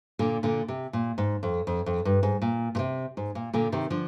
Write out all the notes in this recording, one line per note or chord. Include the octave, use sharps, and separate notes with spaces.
A#2 D3
A#2 D3
C3
A#2
G#2
F2
F2
F2
G2
G#2
A#2
A#2
C3
G#2
A#2
A#2 D3
C3 D#3
D3 F3